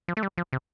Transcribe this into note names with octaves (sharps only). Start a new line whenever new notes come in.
F3
A3
G3
F3
C3